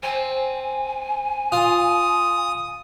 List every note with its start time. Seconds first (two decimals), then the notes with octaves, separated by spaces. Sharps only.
0.03 C4 G#5
1.52 F4 D#6